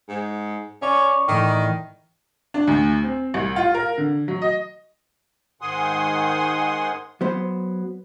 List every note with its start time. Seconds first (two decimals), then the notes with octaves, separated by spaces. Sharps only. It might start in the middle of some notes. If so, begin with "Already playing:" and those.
0.09 G#2
0.82 C#4 D5 C#6
1.28 A2 D#3 E3
2.54 D4
2.67 D2
3.03 C4
3.34 C2
3.56 F4
3.74 A#4
3.98 D3
4.28 F#3
4.42 D#5
5.61 G#2 D#3 F#5 G#5 C6 D#6
7.21 F#3 B3 C5